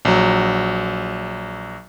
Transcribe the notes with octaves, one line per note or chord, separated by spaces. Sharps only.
A#1 F#3